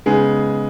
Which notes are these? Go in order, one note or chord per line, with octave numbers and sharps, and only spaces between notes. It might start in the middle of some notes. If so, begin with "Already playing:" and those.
C#3 G#3 B3 D#4 G#4